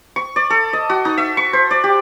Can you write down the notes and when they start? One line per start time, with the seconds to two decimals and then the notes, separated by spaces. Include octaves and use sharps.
0.16 C#6
0.36 D5
0.50 A4
0.73 D#5
0.90 F#4
1.05 D#4
1.17 E5
1.37 C#6
1.53 C5
1.71 D5
1.84 G4